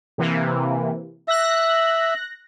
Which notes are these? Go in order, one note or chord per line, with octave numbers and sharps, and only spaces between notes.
C3 E3 A#3
E5 F#6 A#6